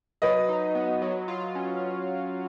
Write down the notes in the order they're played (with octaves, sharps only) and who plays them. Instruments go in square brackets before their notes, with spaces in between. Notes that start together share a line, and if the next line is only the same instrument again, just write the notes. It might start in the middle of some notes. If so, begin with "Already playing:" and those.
[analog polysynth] F#3 [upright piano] B4 D#5
[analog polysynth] D#4
B3
F#3
F4
C#4